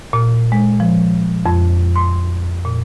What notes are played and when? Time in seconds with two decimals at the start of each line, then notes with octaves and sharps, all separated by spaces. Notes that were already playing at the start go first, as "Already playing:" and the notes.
0.13 A#2
0.52 G#3
0.80 F3
1.46 F2
1.96 C6
2.65 A#2